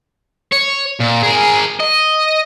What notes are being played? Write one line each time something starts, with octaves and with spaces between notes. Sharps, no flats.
C#5
A#2
G#4 A#4
D#5